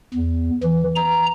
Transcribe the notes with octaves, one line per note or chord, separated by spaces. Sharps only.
E2
E3
A#5